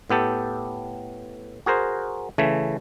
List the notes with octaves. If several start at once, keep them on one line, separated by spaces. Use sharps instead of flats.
A2 B3 G4 A4
F#4 G#4 A#4 C5
C#3 E3 A3